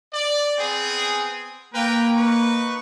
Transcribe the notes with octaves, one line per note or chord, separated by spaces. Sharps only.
D5
B3 C4 G#4
A#3 A#4 B4 G5
D#4 B4 C#6